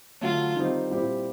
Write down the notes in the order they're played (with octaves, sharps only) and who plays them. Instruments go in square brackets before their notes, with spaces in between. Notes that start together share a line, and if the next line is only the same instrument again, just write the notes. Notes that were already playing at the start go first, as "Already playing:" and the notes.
[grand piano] D3 F#3 A3 [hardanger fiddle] F4
[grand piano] D#3 G3 C4 D#4
A#2 G3 C4 E4 G4